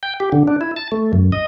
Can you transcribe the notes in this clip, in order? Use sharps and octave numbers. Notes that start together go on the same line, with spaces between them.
G5
G4
D3
D4
E4
A5
A3
F#2
D#5